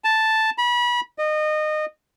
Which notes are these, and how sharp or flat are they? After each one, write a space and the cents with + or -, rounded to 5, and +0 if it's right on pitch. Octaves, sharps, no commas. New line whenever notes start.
A5 +0
B5 -30
D#5 -25